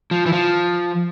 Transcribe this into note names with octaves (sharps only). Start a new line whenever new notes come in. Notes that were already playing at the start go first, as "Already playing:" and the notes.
F3
E3
F3